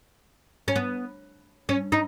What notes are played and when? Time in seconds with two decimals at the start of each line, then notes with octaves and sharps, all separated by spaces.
0.68 C#4
0.76 B3
1.69 C#4
1.92 D#4